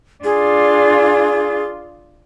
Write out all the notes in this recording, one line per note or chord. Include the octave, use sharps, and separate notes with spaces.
D4 F4 G#4